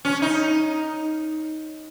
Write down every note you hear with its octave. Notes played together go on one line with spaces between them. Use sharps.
C#4
D#4